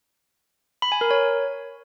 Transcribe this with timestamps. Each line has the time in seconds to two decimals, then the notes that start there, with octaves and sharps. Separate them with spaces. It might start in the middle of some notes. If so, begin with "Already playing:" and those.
0.82 B5
0.92 G#5
1.01 A#4
1.11 C#5